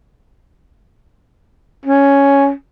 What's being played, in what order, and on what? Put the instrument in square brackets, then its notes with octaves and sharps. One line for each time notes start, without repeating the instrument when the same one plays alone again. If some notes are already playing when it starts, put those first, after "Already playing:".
[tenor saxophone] C#4